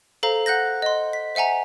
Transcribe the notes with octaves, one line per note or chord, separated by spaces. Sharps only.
A4 C5 F5 A#5
F#5 F#6 G6 A#6
D#5 C6
B6
C5 E5 F#5 G#5 A#5